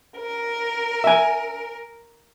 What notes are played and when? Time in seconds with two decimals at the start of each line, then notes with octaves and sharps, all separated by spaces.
0.17 A#4
1.04 E5 G#5